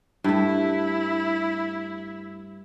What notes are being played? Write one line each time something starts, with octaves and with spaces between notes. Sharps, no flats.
G2 A3 E4